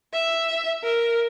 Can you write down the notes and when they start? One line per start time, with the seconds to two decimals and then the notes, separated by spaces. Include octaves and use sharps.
0.13 E5
0.83 A#4